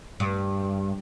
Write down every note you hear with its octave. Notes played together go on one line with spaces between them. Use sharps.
G2